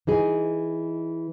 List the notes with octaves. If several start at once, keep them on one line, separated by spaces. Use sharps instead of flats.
E3 D#4 G#4